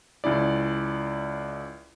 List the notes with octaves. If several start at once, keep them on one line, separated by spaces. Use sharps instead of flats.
C#2 C#4 E4 D5